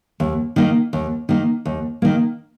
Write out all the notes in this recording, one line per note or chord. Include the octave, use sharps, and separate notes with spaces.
D#2
D#3 A#3
D#2
D#3 A#3
D#2
D#3 A#3